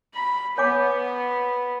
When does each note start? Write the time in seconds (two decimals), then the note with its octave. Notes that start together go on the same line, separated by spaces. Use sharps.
0.14 B5
0.58 B3 C#5 G#5 D6